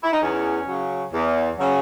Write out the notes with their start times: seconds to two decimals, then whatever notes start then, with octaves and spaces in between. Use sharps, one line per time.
0.03 E4
0.12 D#4
0.22 E2 C#4
0.67 C#3 F#3
1.13 E2
1.58 C#3 F#3